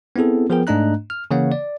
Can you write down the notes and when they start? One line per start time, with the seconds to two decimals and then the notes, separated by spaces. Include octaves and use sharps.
0.16 B3 C4 E4 G#4 A4
0.50 F3 B3 G#4 A#4 G5
0.67 G#2 A3 D4 D#5 A#5 F#6
1.10 F6
1.31 C#3 E3 A#3 C#5 F5 F#5
1.52 D5